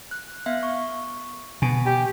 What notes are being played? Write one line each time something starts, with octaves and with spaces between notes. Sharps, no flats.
F#6
B3 E5 F5
C#6
B2 G#5
G4